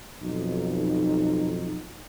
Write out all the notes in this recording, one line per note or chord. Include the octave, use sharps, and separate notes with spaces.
B1 F2 D#4